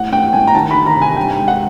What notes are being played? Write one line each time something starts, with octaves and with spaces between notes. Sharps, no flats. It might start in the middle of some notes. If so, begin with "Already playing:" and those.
Already playing: A2 F#5
A2 G5
A2 G#5
A#5
D#3 A5
D#3 B5
A#5
C3
G#5
G2 G5
G#3
F#5